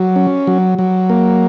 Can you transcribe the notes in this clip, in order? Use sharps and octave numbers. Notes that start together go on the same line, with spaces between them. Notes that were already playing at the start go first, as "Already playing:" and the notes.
Already playing: F#3
C#4
F#3
F#3
A#3